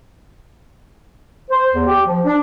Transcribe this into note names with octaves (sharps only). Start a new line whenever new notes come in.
C5
E2
G4
F3
D4